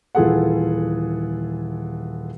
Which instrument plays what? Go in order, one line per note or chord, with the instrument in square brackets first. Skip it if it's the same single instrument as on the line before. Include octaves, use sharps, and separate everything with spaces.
[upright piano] D#1 E3 F4 G#4 A4 F#5